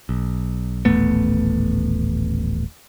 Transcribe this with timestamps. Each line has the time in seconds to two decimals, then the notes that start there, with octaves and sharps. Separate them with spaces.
0.09 B1
0.85 D#1 A1 A3 B3